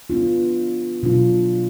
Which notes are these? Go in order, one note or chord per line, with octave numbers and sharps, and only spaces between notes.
B3 D4 F4
B2 F#3 D4 F4